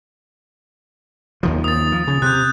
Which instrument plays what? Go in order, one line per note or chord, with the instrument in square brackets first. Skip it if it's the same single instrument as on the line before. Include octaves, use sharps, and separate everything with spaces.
[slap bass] D#2 D#3 F3
[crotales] D#6 A6
[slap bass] F3
C#3
[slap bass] C3 [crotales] F#6 G6